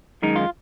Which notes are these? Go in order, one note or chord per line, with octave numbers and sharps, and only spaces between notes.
F#2 D#3 G#3 D#4
F4